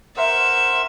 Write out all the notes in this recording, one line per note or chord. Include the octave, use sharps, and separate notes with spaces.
A#4 C5 E5 F#5